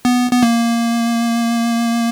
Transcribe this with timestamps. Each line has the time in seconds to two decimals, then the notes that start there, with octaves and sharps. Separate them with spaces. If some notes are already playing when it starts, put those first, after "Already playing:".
0.05 B3
0.31 B3
0.43 A#3